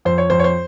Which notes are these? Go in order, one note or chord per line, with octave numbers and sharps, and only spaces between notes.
F2 C5
C#5
F2 C5
C#5
C5